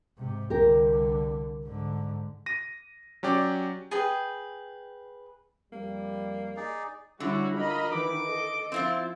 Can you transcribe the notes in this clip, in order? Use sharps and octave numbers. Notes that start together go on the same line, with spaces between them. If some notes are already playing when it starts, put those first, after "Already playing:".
G#2 C3
C2 D3 G4 A#4
G#2 D3
A#6 D#7
F#3 C#4 G4 D5
G#4 B4 G5
F2 G3 A#3
D#4 G#4 D5
D3 G3 C#4 E4 F#4
F4 A#4 D#5 B5
D#3 E3 D6
A4 D#5
F3 C4 E4 F4